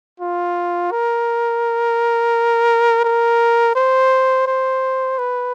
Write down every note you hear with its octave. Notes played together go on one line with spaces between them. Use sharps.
F4
A#4
A#4
C5
C5
B4